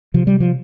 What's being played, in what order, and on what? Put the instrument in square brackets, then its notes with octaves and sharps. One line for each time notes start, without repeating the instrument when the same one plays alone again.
[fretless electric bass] C3 F3
G3
F3